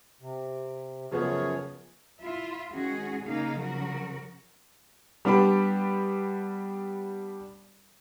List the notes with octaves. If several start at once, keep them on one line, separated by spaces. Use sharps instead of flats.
C3
F#2 C#3 F3 B3 G#4 C#5
E4 F4 E5
D#3 G#3 C#4 F#4 G#4
C#3 A#3 D#4 G#4 F5
C#3 F3 F#3 F#4 A#4
G3 B3 D4 G4 B5